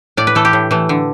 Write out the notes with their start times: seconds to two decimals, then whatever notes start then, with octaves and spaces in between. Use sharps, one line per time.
0.17 A2 D5
0.27 B4
0.35 E3 A3 A4
0.45 G4
0.53 A2
0.71 E3 A3
0.89 D3